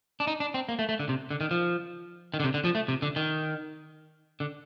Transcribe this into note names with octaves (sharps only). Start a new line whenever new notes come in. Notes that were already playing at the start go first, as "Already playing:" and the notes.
D4
D#4
D4
C4
A#3
A3
A3
D3
C3
D3
D#3
F3
D#3
D3
C3
D3
F3
A3
C3
D3
D#3
D3